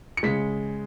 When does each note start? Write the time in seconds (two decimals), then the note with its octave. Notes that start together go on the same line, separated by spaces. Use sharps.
0.17 C#7
0.23 C#3 G#3 B6